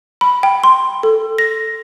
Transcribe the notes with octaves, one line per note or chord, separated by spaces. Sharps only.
B5
G5
C6
A4
A#6